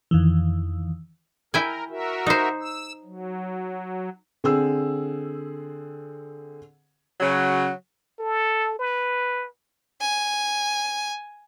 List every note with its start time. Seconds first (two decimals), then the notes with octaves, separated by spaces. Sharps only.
0.11 F2 D#3 E3
1.54 E4 A#4 G5 G#5
1.90 F#4 A#4 E5
2.26 D#4 C5
2.60 E6
3.04 F#3
4.44 D3 C4 G#4 E6
7.20 C#3 F#3
8.19 A4
8.79 B4
10.01 G#5